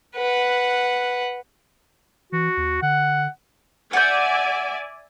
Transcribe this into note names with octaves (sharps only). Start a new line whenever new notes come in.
B4 F#5
E3 F#4
D#2
D3 F#5
D5 E5 F#5 G#5 G6